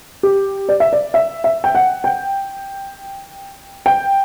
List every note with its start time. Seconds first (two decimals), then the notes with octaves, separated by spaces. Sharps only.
0.23 G4
0.69 D5
0.80 E5
0.93 D5
1.14 E5
1.44 E5
1.64 G5
1.75 F#5
2.04 G5
3.86 G5